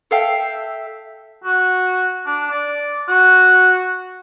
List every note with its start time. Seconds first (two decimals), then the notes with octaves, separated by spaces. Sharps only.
0.11 A4 E5 F5 G5
1.44 F#4
2.26 D4
2.51 D5
3.09 F#4